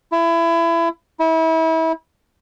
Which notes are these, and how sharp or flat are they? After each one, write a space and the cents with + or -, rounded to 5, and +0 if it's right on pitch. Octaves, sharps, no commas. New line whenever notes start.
E4 +25
E4 -30